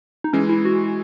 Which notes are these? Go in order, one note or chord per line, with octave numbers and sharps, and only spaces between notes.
D#4
E3 G#3 C#4
E4
F#4